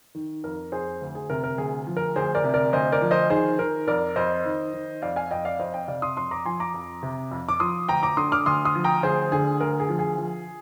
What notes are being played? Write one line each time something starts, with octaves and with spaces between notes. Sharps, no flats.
D#3
F2 A#4
F2 G#4 C5
D2
G#4
C3 A#4
A#4
D2 G#4
F3
A#4
D2 G#4 C5
A#4 D5
C3
A#4 D5
D2 C5 D#5
A#4 D5
F3
C5 D#5
D#3 G#4 C5
D#3 A#4
F2 A#4 D5
F2 C5 D#5
D#3
D#3
F2 D5 F5
F5 G#5
F2 D#5 G5
D5 F5
F2 C5 D#5
D#5 G5
C3 D5 F5
C6 D#6
F2 C6 D#6
A#5 D6
F3 G#5 C6
A#5 D6
F2
C3
F2
D6
F3 C6 D#6
D2 G5 A#5
A#5 D6
D3 C6 D#6
D6 F6
D2 C6 D#6
C6 D#6
F3
G5 A#5
D2 G#4 C5
D3 G#4
D2 A#4
G#4
F3
G#4
F3